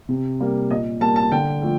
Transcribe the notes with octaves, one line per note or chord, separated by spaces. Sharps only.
C3
G3 A#3
A#2 D#5
G3 A#3 A5
A5
D3 G5
F3 A3